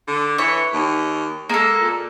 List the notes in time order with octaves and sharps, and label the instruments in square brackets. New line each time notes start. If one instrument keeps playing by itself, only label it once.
[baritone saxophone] D3
[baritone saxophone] E3 [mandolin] C#5
[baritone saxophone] D#2
[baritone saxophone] G#3 [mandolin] A#3 A4
[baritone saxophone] A#2